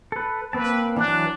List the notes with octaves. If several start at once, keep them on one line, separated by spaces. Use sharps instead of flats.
A4 B4
A#3 C4 B4 A5
E3 F#3 D4 F#6